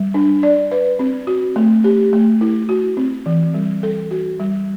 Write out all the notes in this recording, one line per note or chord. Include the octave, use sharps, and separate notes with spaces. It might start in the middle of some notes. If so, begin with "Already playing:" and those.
Already playing: G3
D4
D5
B4
C4
F#4
A3
G4
A3
E4
F#4
C4
E3
G3
A4
F#4
G3